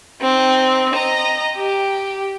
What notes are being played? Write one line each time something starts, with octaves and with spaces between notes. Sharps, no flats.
C4 D#4
D#5 A#5
G4